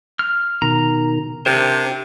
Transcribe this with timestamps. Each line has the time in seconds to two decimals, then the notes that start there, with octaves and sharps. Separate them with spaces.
0.19 F6
0.62 B2 D#3 A#5
1.46 C3 D4 G4 A#4 C5